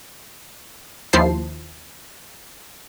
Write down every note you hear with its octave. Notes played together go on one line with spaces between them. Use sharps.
D#2 F3 E4 C5 A5 C7